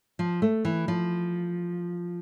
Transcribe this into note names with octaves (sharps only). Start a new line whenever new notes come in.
F3
A3
E3
F3